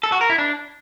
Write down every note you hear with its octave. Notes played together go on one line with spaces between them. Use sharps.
A4
F#4
A#4
E4
D4